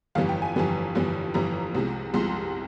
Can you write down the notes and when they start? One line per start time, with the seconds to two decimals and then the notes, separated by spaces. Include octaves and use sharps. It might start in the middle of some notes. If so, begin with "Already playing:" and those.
0.15 G1 F2 E3 G3 F5
0.29 G5
0.42 G#5
0.56 G1 F2 E3 G3
0.95 G1 F2 E3 G3
1.34 G1 F2 E3 G3 A#5
1.75 C2 C3 F3 G#3
2.14 C2 C3 F3 G#3 C6